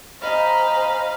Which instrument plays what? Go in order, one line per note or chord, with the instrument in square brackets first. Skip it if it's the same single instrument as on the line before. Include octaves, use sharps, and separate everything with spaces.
[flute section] C5 G#5 A#5 [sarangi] D#5 [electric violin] F5 B5